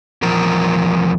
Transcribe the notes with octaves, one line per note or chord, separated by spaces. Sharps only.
E2 F3 A#4